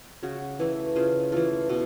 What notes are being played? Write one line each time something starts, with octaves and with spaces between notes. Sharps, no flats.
C#3 F#4
E3 A3
C#3 F4
E3 A3 F4
B2